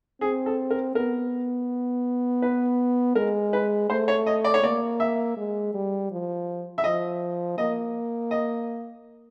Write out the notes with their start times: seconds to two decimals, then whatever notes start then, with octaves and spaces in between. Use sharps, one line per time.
0.21 C4 G#4
0.46 A4
0.70 A#4
0.95 B3 A#4
2.42 B4
3.15 G#3 A#4
3.53 B4
3.89 A3 C5
4.08 C#5
4.26 D#5
4.44 D5
4.54 C#5
4.63 A#3 D5
5.00 E5
5.37 G#3
5.74 G3
6.11 F3
6.78 E5
6.84 F3 D#5
7.58 A#3 D#5
8.31 D#5